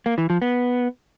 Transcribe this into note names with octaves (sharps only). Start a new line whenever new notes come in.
A#3
E3
F3
B3